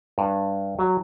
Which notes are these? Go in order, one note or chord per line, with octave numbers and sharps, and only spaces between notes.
G2
F#3